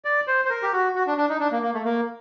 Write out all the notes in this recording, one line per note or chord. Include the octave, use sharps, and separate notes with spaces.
D5
C5
C5
A#4
G4
F#4
F#4
D4
D4
D#4
D4
A#3
A#3
A3
A#3